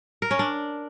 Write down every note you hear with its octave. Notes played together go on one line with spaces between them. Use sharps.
A#4
C#4
D4